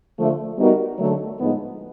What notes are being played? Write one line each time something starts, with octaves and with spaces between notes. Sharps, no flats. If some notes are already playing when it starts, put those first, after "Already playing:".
D3 F3 A3
G3 B3 D#4 F#4 A#4
D3 F#3 A3
A2 F3 G#3 B3 D#4